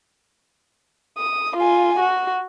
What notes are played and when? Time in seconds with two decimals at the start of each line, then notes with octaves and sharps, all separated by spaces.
1.18 D#6
1.57 F4 G#5
2.00 F#4